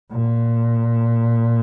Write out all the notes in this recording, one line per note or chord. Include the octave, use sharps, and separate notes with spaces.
A#2